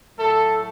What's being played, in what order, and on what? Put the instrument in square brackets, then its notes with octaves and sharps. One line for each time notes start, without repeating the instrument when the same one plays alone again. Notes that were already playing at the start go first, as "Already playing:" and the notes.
[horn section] A2 F#3 A3 A4